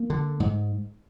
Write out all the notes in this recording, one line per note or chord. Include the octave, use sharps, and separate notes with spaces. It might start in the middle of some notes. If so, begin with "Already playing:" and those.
Already playing: A#3
D3
G#2